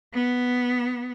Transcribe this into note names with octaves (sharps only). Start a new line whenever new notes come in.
B3